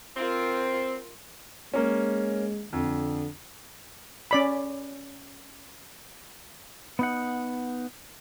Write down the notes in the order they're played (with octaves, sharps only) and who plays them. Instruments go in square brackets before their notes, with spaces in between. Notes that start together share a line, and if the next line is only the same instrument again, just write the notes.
[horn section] C4 [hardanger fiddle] F4 A#4
[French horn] G#3 [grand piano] A#3 C#4
[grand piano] F2 [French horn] D3
[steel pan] C#4 D5 B5
[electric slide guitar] B3 D#4 F#5